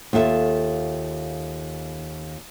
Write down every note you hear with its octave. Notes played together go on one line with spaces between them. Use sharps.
D#2 F4 A4 E5